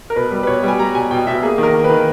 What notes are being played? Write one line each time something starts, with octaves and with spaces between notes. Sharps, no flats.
A#4
B2 B4
G3
B4
B2 C#5
G3 G#5
G3 A#5
B2 G#5
B2 G5
B2 E5
A#3 G#4
D#3
A#4
D#3
B4
D#3